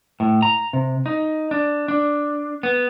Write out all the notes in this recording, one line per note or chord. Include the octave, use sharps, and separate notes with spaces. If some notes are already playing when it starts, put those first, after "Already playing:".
A2
A#5
C3
D#4
D4
D4
B3